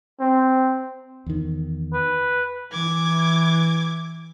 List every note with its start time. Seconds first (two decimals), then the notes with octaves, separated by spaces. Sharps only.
0.20 C4
1.26 E2 D#3
1.93 B4
2.72 E3 D6 G#6